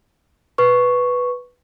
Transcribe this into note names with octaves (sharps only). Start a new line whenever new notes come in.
B4 C#6